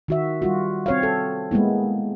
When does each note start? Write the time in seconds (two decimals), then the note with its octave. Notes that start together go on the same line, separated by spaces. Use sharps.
0.08 D#3 F#4 E5
0.42 G3 F4 F#4
0.86 C4 C#5 F5
1.03 A4
1.51 G#3 A#3 B3 E4